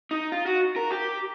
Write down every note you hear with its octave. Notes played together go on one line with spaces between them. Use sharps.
D#4
F4
F#4
A#4
G4